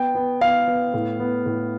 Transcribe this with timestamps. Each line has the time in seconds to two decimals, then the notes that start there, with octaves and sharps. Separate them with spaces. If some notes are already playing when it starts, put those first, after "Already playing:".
Already playing: B3 G5
0.15 B3
0.41 B3 F5
0.67 B3
0.94 A2
1.19 B3
1.46 A2